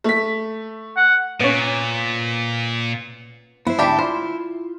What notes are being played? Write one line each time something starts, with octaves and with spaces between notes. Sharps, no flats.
A3 B6
F#5
A#2 B3 C#4
B3 E4 C5
D2 G#2 D4 G4 A5 B5
F4 C5